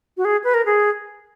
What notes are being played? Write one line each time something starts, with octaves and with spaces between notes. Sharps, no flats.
F#4
G#4
B4
A#4
G#4